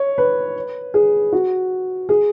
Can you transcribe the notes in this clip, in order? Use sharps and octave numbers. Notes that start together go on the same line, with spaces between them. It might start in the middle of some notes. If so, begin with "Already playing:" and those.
Already playing: C#5
B4
G#4
F#4
G#4